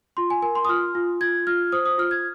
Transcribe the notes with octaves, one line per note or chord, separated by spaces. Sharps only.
F4 C6
G#5
A#4 G#5
C6
D#6
F4 F6
F4
F4 G#6
F4 F6
C5 D#6
D#6
F4 F6
G#6